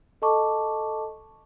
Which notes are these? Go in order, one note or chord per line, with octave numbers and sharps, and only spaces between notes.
A4 D#5 A5 C#6 D6